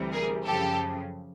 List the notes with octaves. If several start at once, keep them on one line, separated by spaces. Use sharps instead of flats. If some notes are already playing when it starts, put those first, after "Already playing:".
Already playing: D2 C3 E3 G3
G#4 A#4
F#2 C#3 F3 G4 A4